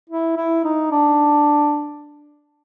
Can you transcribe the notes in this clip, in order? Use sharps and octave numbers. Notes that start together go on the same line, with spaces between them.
E4
E4
D#4
D4